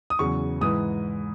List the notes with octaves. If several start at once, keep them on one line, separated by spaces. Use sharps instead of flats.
D#6
E2 C#3 F#3 C#6
G#2 E3 D#6